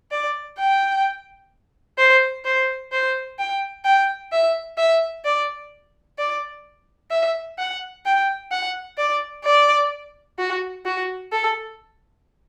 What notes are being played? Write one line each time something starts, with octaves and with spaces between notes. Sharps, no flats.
D5
G5
C5
C5
C5
G5
G5
E5
E5
D5
D5
E5
F#5
G5
F#5
D5
D5
F#4
F#4
A4